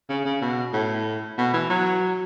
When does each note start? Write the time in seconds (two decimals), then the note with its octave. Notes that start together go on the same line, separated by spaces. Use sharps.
0.09 C#3
0.26 C#3
0.42 B2
0.73 A2
1.38 B2
1.53 E3
1.69 F#3